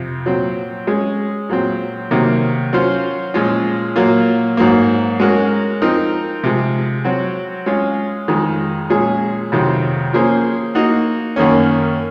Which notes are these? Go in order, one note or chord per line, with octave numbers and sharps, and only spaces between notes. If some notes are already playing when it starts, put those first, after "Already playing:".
Already playing: F2 C3
A#2 F#3 C4
G#3 C#4 G#4
A#2 F#3 C4
C3 D#3 F#3 A#3
F#3 C#4 F4 C5
A#2 F3 G#3 C#4 F4
A#2 F#3 A#3 F4
G#2 F#3 A#3
G#3 C#4 F#4 A#4
F3 C4 D#4 A#4
C3 F3 G#3
F#3 C4 F#4
G#3 C#4 F4 G#4
F2 D#3 G#3
A#2 F3 G#3 C#4 G#4
F2 C3 D#3 F#3 C4
F3 A#3 C#4 G#4 C5
A#3 D#4 F#4
F#2 D#3 A#3 C#4